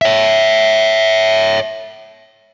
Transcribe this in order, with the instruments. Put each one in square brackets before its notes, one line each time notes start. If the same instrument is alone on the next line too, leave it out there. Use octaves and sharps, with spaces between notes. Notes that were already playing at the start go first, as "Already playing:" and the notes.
[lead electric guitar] C#5 E5